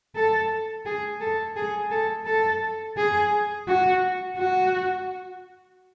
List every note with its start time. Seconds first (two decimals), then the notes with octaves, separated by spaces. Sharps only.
0.15 A4
0.86 G#4
1.21 A4
1.56 G#4
1.91 A4
2.26 A4
2.97 G#4
3.68 F#4
4.37 F#4